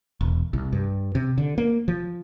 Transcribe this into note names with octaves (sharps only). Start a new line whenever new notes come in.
E1
C2
G2
C3
D3
A#3
F3